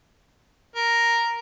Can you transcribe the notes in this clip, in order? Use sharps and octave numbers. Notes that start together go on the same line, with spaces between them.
A#4